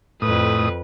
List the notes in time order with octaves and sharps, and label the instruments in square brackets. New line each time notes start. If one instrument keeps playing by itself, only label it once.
[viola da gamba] F2 B4 [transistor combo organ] A2 D#6